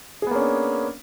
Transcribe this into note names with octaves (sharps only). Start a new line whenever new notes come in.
A#3 B3 C#4 D4 G#4